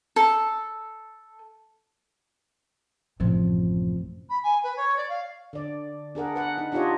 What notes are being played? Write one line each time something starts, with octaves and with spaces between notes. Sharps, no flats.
A4
A1 F#2 A2 C3 F3
B5
G#5
B4
C#5
D5
F5
D3 D5
D4 G#4 A#4 F#5
B4 F#5
D#4
D4 D#4 F4 G4 C#5 D#5